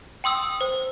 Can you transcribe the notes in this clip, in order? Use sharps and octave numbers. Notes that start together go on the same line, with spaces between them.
G5 C6 D#6 E6
C5